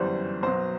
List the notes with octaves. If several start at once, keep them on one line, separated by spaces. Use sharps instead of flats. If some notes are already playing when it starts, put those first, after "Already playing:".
Already playing: G1 F#2 E3 G3 C5
B1 B2 F#3 C5